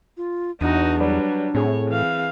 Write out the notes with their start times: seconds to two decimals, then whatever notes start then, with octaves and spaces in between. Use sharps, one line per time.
0.17 F4
0.61 E2 D4 D#4 F#4
1.00 F#3 G3 B4 D5
1.55 A2 C4 G#4 C#5
1.88 E3 F5